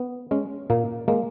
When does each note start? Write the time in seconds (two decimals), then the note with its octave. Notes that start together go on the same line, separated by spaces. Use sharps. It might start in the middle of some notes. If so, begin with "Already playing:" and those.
Already playing: B3
0.31 G#3 C#4
0.70 A#2 A#3
1.08 G#3 A#3